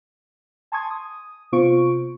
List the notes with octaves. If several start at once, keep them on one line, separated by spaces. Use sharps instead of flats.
G#5 A5 C6 C#6 D#6 G#6
D#6
C3 B3 F4 C5 C#6 D7